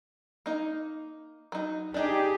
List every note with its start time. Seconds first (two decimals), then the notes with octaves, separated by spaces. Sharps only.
0.46 A#3 D#4
1.52 F#3 D#4
1.94 D4 D#4 G4 G#4